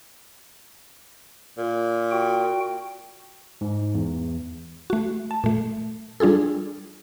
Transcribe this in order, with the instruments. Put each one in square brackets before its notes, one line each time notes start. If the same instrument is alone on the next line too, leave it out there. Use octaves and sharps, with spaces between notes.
[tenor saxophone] A#2
[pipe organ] F#4 G5
[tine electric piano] G#2
E2
[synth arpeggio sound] A3 F#4
A5
A#2 A3
G3 D4 F4 G#4 A4